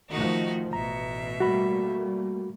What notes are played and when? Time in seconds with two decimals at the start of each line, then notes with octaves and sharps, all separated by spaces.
0.10 D#3 F3 A3 D#4 F#4
0.73 A1 B2 E5 A#5
1.40 G3 A3 A#3 F#4 B5